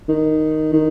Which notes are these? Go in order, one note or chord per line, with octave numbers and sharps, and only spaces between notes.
D#3
D#3